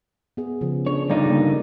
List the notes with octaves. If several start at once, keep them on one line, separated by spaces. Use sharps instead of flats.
B3 G#4
C#3 F3
D4 G#4 C#5
G2 D3 D#4 D5
C#3 A#3